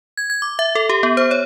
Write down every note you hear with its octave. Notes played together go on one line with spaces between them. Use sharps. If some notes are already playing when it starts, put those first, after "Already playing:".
G#6
G#6
D6
E5
A4
G4
B3
C5
C#5